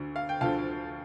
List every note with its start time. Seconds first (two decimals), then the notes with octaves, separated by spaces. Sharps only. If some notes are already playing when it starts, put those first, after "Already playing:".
Already playing: D2 D3
0.16 F5
0.29 G5
0.41 D2 D3 F3 F5 A5